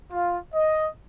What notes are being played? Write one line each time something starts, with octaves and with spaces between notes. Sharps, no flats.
F4
D#5